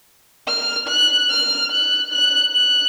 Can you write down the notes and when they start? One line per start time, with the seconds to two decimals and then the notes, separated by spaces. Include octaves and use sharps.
0.48 F6
0.88 F#6
1.30 F6
1.71 F#6
2.12 F#6
2.54 F#6